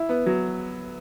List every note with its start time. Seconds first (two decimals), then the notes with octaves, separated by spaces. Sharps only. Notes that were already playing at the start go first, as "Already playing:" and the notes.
Already playing: E4
0.09 B3
0.26 F#3